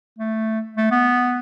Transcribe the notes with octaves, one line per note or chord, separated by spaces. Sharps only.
A3
A3
B3